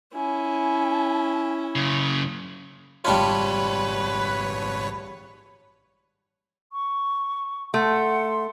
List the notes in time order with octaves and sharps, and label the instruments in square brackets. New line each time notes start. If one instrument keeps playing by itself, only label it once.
[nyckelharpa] C#4 E4 [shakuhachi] G#5
[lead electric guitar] F#2 C#3
[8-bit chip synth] G#1 C#5 [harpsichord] G3 D4 F4 [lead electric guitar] B4
[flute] C#6
[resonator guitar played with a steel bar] A3 [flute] F#5 [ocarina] C6